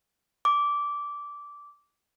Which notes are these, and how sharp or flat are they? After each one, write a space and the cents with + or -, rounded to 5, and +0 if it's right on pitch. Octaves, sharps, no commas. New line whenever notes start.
D6 -15